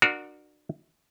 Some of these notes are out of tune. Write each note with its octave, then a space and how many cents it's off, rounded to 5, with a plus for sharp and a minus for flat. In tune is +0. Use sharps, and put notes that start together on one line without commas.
D4 +30 F#4 -15 A#4 +0